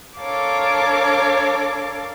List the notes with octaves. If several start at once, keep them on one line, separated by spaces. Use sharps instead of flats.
D4 A4 A#4 C#5 F5 D6